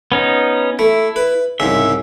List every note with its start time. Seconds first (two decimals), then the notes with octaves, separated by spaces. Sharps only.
0.12 B3 C#4 D#4
0.79 A3 E4
1.16 B4
1.60 C2 G#2 C#3 E5